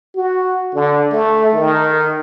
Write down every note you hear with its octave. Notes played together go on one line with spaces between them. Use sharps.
F#4
D3
A3
D#3